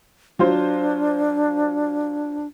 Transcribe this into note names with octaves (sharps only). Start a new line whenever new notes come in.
F#3 D4 F4 C5